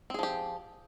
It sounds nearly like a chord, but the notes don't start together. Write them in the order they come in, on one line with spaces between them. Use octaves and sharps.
C4 G#4 F3 G4